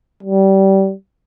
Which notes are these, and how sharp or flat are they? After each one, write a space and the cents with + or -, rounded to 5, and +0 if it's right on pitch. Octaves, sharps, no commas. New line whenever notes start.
G3 -25